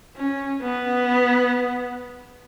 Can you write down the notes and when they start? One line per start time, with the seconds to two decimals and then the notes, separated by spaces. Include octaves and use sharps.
0.17 C#4
0.62 B3